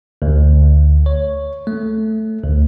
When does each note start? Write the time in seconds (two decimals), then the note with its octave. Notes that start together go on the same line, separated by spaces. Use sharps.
0.22 D2
1.06 C#5
1.67 A3
2.44 D2